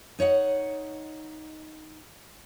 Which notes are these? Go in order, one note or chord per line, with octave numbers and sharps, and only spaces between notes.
D#4 C#5 D#5 F#5